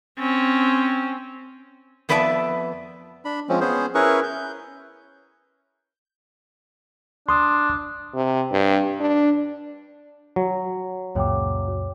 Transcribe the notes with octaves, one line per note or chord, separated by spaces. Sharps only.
C4 C#4
F2 B3 B4 D5 E5 A5
D4 B5
F3 G#3 C4 C#4
B3 C#4 G#4 C5
C#4 E4 G#4 A#4 B4 C#6
G6
D4 C6 D#6
C3
G2
D4
F#3
C#2 F#2 A#2 C#5 G5 D6